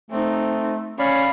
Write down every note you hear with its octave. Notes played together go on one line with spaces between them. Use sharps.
A3 C4 D#4
C#4 C#5 D5 F5 B5